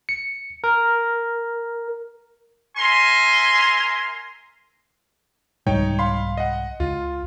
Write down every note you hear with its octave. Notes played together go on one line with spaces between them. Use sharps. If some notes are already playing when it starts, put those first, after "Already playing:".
C#7
A#4
A#4 E5 G#5 C6
C2 G#2 G3 D#4 C#5 G5
F5 B5 C6
D#5 F#5
C#2 F4